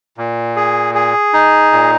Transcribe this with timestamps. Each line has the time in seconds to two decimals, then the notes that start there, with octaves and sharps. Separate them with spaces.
0.17 A#2
0.56 G#4
0.95 G#4
1.33 D#4
1.72 A#2